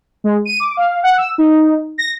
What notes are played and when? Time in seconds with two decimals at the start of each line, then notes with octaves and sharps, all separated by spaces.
0.24 G#3
0.45 D#7
0.60 D6
0.77 F5
1.03 F#5
1.18 E6
1.38 D#4
1.98 A#6